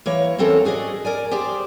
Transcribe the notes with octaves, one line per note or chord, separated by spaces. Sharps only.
E3 A#3 C#5
E2 C4 C#4 A4 A#4
F#4 G#4 D5 D#5
A#4 D5 G#5
G4 G#4 C5 D5